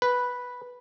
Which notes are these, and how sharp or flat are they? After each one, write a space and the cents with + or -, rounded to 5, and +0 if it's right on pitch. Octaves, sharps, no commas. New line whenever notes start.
B4 -5